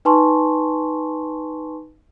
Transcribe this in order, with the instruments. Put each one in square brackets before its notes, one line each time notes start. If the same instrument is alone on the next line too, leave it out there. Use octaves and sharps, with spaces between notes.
[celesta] D#4 B4 G#5 A5 C6 C#6